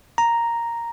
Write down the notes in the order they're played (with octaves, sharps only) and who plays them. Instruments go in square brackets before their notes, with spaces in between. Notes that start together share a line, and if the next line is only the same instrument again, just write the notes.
[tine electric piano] A#5